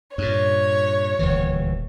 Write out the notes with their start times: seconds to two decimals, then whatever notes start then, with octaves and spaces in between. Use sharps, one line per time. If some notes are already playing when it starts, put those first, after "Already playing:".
0.18 G2 A#2 C#5
1.19 D#1 D2 E3